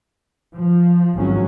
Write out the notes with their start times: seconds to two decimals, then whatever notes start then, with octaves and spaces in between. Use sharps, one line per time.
0.54 F3
1.15 G#1 F3 F#3 C#4